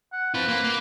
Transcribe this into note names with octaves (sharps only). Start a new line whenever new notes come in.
F#5
C4 F4 B4
A#3
A#3